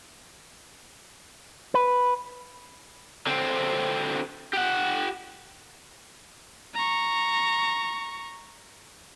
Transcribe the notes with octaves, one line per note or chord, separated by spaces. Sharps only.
B4
D3 C4
G4 F#5
A#5 C#6